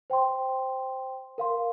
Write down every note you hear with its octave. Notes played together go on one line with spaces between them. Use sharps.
C5 G5 C6
A#4 F5 C6